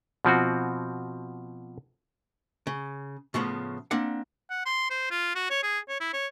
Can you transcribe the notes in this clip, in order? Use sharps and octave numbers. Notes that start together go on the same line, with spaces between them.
B2 F3 C4 F#4
C#3
A2 C#3 F3 B3
A#3 C4 D4 F#5
F#5
C6
C5
F4
F#4
C#5
G#4
C#5
E4
C#5